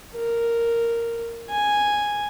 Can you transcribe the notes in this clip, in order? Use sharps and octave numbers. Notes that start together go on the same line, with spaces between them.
A#4
G#5